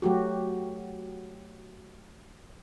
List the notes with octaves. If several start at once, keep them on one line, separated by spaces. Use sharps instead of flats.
F#3 A3 F#4 G4